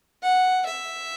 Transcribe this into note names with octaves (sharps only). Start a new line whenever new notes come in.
F#5
E5